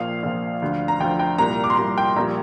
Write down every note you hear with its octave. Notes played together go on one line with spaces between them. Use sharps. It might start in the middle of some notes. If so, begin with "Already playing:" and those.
Already playing: A#1 A#2 F3 F5
A#1 A#2 F3
D2 D3 F3
A#5
D2 D3 F3 G5
G5
C2 A#2 G3 A#5
D6
C6
C2 A#2 G3 A#5
G5
A#1 A#2 G3 A#5